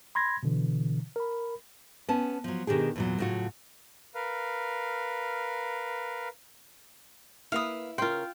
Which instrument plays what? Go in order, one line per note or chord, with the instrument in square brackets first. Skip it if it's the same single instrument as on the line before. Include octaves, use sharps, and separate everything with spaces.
[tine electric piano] B5 C6 G#6 A#6
B2 D3 E3
A#4 B5
[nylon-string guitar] B3 C#4 A5
F3 F#3
B2 D#3 D4 G4 G#4
E2 A#2 F#3
A2 C#3 F#3 F4 F#4
[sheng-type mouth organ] A#4 B4 F5
[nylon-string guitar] A#3 B4 [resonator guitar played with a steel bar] E4 [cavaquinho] F5 D#6
[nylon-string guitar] C#3 A#4 [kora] F4 G5 [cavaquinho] C6